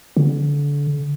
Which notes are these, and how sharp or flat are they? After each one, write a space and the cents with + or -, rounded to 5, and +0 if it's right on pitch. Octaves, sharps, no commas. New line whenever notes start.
D3 -30